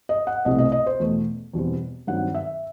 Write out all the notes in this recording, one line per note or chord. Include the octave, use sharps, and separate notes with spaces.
D#5
F#5
C2 B2 A3 C4 D#5
D#5
D#5
C5
E2 B2 A3
E2 B2 G3 C4
G2 D#3 F#3 C4 F#5
E5